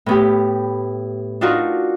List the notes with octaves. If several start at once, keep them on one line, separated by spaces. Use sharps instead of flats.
A2 B3 G4
D4 D#4 F4 F#4 A#4